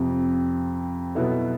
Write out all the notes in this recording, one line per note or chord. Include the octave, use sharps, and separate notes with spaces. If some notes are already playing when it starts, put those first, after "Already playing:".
Already playing: F2 C3 F3
B2 F#3 B3 E4 A4